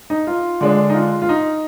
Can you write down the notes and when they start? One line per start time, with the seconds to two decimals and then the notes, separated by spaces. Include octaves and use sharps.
0.10 D#4
0.27 F4
0.61 D3 G#3 D4
0.90 D#4
0.94 F4
1.22 F4
1.29 D#4